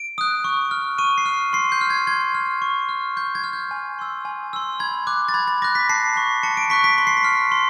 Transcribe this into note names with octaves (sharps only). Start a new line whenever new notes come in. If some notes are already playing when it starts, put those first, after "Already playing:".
Already playing: D7
D#6 F#6
C#6
F6
C#6 D#7
C7
F6
C6 C7
G6
F6
G#6
C6 G#6
F6
C#6
F6
C#6 G6
G#6
F6
G6
G#5
C6 E6
G#5
C6 E6
B5 G#6
D6 F#6
A6
B5 G#6
A6
D6 F#6 A#6
B6
A5 C7
C#6 F#6
A5 C#7
D7
C#6 F#6 B6
B6
C6 B6
C7
B6
F6
C6